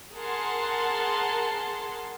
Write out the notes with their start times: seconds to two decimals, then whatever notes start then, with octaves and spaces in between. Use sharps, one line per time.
0.15 G#4 A#4 F#5 A5 C6